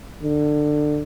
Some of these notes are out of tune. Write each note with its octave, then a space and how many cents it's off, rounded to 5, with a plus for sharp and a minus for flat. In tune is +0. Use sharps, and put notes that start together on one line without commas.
D3 +20